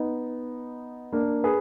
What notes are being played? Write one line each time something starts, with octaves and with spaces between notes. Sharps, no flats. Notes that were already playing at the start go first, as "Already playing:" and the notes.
Already playing: B3 D#4
A#3 D4
G#4 B4